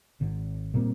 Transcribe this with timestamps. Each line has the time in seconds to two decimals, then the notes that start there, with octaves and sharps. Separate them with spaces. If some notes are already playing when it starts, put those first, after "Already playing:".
0.21 G#1
0.74 A#2 G3 A#3 C4